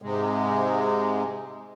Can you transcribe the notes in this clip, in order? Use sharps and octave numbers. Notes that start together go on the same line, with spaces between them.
G#2 C3 G#3